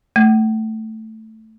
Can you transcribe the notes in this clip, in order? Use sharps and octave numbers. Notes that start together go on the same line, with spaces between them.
A3